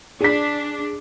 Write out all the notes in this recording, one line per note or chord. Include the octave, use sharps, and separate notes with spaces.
D4 G#4 B6